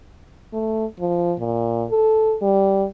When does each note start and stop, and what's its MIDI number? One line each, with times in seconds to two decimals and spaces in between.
0.53 0.86 57
1.00 1.33 53
1.39 1.85 46
1.91 2.36 69
2.42 2.85 55